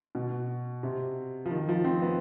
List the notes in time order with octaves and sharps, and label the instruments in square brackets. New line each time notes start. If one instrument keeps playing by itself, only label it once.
[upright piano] B2
C3
F3
D#3
F3
C4
B3